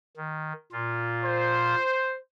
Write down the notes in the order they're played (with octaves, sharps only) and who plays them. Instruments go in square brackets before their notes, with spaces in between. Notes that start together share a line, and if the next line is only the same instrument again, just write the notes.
[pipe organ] D#3
A#2 F4
[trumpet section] C5